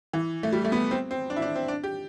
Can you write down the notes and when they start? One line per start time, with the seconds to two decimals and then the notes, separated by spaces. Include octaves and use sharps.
0.13 E3
0.43 A3
0.53 G3
0.65 A3
0.72 B3
0.91 C4
1.11 C4
1.30 D4
1.36 E4
1.42 D4
1.55 C4
1.68 D4
1.84 G4